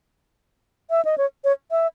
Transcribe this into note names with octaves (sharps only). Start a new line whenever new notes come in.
E5
D#5
C#5
C#5
E5